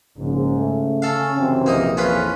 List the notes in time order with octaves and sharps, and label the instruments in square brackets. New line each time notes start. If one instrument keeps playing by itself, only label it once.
[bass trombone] A#1 [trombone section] G#2 [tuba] C#3
[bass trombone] A3
[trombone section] C#4 [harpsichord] A4 F5
[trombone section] F#2 C3 E3 [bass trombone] C4
[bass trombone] A#1 [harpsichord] A#3 D#4 D#6
[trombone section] F2 E3 [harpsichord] C#4 F4 B4